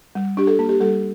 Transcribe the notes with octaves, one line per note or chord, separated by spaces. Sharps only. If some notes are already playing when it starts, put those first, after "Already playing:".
G3
D4 G4
A4
A#3
G4
G3 A4